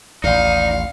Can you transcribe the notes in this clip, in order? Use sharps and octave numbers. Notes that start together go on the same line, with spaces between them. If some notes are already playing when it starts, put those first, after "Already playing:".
A1 D#2 D#4 D5 F5